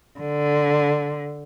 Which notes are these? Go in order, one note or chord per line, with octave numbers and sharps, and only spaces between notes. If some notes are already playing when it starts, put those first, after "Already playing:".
D3